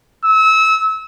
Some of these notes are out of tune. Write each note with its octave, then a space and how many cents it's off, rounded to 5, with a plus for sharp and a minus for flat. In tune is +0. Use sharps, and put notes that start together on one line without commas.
E6 -30